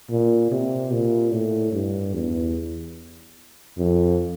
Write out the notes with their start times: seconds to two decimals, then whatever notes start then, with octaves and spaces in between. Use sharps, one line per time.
0.10 A#2
0.51 C3
0.92 A#2
1.32 A2
1.73 G2
2.14 E2
3.78 F2